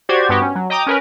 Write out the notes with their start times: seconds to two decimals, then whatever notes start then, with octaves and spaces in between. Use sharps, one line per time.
0.09 F#4 G4 C5 D5 G#6
0.29 G2 B3 F#4 G4
0.42 C#4
0.55 F#3
0.70 D#5 G5 A#5 D6 D#6
0.87 C#4 A#4 B4